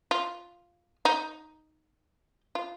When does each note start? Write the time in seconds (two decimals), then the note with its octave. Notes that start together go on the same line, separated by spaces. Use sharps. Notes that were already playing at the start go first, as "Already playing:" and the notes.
0.11 F4
1.05 D#4
2.55 F4